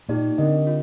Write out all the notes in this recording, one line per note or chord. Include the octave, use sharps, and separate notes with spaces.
A#2 D#4 G4 D5
D3 C4 G4 A#4 D#5
F4